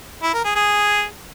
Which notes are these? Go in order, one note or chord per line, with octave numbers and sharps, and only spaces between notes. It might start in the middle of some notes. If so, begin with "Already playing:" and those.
E4
A#4
G#4
G#4